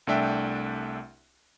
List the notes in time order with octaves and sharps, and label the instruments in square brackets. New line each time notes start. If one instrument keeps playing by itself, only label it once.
[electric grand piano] C2 A3 D4 E5 G5